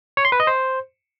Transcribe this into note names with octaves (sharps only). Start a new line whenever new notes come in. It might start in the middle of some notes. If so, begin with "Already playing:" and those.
C#5
C6
B4
D#5
C5